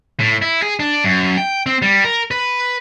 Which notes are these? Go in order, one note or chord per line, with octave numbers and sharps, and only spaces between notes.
A2
E4
G#4
D4
F#2
G5
C4
G3
A#4
B4